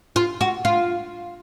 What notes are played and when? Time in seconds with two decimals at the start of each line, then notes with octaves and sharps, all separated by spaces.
0.16 F4
0.41 F#4
0.65 F4